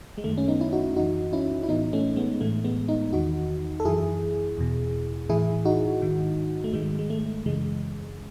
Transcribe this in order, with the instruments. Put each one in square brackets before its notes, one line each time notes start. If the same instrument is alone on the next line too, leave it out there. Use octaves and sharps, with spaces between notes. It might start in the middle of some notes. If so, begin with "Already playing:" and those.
[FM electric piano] G#3
F#2 D#3 A3
C#4
B3 D#4
E4
D#4 F#4
F#2 E3 D#4 F#4
C#4 E4
E4
A2 E3 B3 D#4
A3 C#4
G#3 B3
A2 E3 A3
G#3 B3
B3 D#4
E2 D#3 D#4 F#4
A4
F#2 E3 E4 G#4
E2 B2
A2 E3 E4 G#4
D#4 F#4
G#2 D#3
A3
G#2 D#3 G#3
G#3
A3
F#2 C#3 E3 G#3